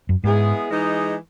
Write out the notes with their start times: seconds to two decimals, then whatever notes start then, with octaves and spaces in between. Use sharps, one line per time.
0.09 F#2
0.24 G#2 G#3 B3 E4 G#4
0.70 E3 G#3 D#4